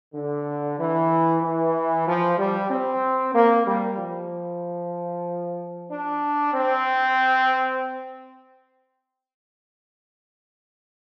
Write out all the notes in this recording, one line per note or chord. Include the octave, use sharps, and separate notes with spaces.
D3
E3
E3
F3
G3
C4
A#3
G3
F3
D4
C4